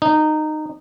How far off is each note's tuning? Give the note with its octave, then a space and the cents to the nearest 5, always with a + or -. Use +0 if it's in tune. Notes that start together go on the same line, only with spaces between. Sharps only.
D#4 -15